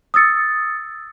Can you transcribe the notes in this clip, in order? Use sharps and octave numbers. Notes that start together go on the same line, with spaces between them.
D#6 E6 A6 C#7